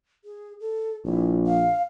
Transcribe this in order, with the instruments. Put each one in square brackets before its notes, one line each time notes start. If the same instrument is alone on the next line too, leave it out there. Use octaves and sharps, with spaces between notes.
[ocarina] G#4
A4
[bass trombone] A#1 [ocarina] E4
[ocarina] F5